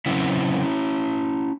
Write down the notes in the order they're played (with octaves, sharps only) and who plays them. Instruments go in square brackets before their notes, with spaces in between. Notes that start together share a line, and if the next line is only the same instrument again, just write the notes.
[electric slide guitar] C#3 F#3 C4 C#4 E4